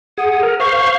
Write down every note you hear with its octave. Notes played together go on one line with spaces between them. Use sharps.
G#4 F#5
A#4
C5 F5 C#6